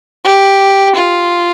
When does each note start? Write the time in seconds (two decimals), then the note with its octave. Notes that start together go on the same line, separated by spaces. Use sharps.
0.24 G4
0.95 F4